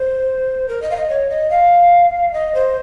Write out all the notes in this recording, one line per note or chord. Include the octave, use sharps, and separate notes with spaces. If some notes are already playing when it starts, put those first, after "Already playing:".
Already playing: C5
A#4
D#5
F5
D#5
C#5
D#5
F5
D#5
C5